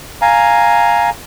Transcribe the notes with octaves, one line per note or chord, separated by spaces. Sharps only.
F5 G#5 A#5